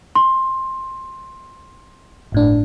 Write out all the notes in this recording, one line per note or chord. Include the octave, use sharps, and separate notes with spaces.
C6
G1 A2 D4